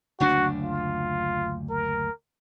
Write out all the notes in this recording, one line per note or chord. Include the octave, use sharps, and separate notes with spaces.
F#1 D2 D4 F#4
F4
A#4